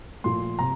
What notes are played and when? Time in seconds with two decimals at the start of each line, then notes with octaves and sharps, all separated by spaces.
0.24 A#2 F3 A3 C6
0.59 C3 A#5